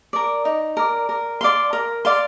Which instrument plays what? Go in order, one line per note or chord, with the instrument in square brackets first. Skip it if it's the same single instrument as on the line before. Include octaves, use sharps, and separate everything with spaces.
[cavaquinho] A#4 D5
D#4
A#4 D5
A#4
D5 F5 C6
A#4
D5 F5 C6